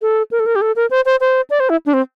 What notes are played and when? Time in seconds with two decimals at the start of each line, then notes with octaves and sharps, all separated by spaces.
0.02 A4
0.31 A#4
0.40 A4
0.46 A#4
0.56 G4
0.61 A4
0.76 A#4
0.91 C5
1.06 C5
1.21 C5
1.50 D5
1.60 C5
1.70 E4
1.86 D4
1.94 C4